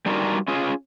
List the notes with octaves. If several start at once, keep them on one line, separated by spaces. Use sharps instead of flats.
G3 D4 D#4 F4 F#4 A#4
C#4 F4 G#4